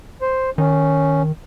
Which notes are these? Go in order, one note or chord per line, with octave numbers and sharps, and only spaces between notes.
C5
D#3 C#4